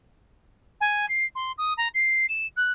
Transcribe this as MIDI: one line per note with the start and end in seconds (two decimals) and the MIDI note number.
0.80 1.08 80
1.09 1.25 96
1.35 1.52 84
1.58 1.73 87
1.77 1.88 82
1.94 2.26 96
2.29 2.47 100
2.56 2.72 90